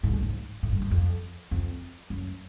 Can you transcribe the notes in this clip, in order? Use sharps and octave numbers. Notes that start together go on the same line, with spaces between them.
G#2
G2
G#2
A2
G2
F#2
F2
F2
F#2